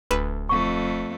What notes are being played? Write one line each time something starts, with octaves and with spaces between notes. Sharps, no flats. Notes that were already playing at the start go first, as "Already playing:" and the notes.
D1 D2 B4 E7
F2 A3 C#6